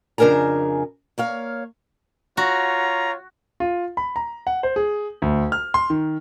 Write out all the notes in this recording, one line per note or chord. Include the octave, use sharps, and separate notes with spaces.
F2 C#3 D4 A#4 G#5 A#5
A#3 C#5 F5
F4 F#4 C#5 A#5
F4
B5
A#5
F#5
C5
G#4
D2
F6
C6
D#3